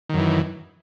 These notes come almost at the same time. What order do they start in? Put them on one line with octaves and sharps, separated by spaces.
D#3 F#2 E3